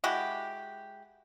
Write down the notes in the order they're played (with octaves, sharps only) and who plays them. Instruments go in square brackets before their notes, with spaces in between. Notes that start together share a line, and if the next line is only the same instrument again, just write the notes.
[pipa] G#3 E4 F#4 G4